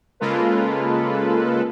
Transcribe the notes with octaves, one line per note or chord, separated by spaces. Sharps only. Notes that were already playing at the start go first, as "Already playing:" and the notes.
C#3 G#3 A#3 F4 A4 B4